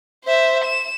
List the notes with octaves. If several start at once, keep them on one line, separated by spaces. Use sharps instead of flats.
C5 E5
E7